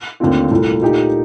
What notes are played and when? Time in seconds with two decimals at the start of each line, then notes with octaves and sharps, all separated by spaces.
0.20 D#2 D3 A3 C4 F4
0.51 C2 A#2 A3
0.81 A#2 A3 D#4 G4